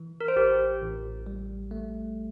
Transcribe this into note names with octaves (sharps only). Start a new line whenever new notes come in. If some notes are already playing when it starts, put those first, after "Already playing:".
Already playing: E3
A#4
C5
A1 G4 A#4
A1
G3
A3